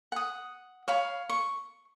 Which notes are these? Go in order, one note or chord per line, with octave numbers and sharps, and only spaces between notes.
F#5 D#6
C#5 F5 B5
C#6